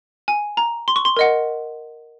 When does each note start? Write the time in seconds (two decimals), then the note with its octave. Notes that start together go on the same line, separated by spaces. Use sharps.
0.28 G#5
0.57 A#5
0.88 C6
0.96 C#6
1.05 C6
1.16 A#4 D#5 F#5